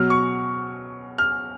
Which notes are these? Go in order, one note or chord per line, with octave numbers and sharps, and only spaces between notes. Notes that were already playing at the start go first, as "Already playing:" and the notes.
Already playing: B2 F#3 F6
C#6
F6